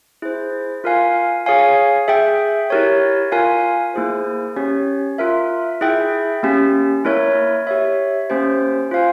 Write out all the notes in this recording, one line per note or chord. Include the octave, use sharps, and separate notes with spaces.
E4 G#4 C5
F4 A#4 F5 G#5
G#4 C#5 F5 G#5
G#4 E5 G5
E4 G4 A#4 C#5
F4 A#4 F5 G#5
A#3 E4 G#4 C5
C#4 G4 C#5
F4 A#4 E5
E4 G#4 E5 G5
A#3 C#4 G4
A#3 E4 A#4 C#5 E5
G4 C#5 E5
A#3 C#4 G4 C5
F4 C5 F5 G#5